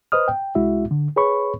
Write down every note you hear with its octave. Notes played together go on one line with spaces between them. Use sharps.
B4 C5 D#5 D#6 F6
G5
C2 G#3 E4 F#4 E5
D3
G#4 B4 C#5 B5 C#6